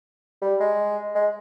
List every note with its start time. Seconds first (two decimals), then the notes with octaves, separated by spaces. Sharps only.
0.42 G3
0.60 G#3
1.15 G#3